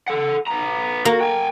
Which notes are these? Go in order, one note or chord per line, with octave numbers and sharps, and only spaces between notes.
A4 F#5
B3 A#5
A#3 F#4
G5 G#5